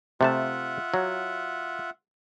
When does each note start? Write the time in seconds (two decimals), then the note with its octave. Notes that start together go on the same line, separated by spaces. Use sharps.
0.21 C3 A3 F4 E5 F#5 A5
0.94 F#3